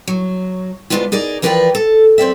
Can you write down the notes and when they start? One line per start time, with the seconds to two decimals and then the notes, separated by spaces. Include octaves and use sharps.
0.08 F#3
0.90 D2 A2 G#3 B3 D4 F4
1.12 D#4 G#4 A#4 D5
1.42 E3 F3 A#4 B4 D5 G5
1.75 A4
2.18 F#2 C4 D5 E5